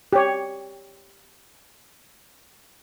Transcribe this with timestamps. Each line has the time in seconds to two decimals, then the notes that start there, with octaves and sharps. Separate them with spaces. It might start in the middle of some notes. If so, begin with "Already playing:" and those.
0.13 G4 C#5